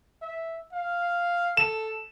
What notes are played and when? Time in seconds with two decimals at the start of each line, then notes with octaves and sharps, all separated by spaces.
0.22 E5
0.73 F5
1.57 A4 E7